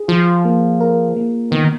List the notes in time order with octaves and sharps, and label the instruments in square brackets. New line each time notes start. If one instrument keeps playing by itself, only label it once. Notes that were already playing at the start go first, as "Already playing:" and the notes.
Already playing: [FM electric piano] G#4
[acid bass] F3 [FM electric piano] F4
[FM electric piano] A#3
A#4
A#3
[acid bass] D#3 [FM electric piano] B3